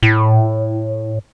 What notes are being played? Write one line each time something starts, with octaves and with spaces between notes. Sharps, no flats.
A2